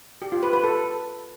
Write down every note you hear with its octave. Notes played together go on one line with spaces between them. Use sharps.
G4
F4
B4
B4
A4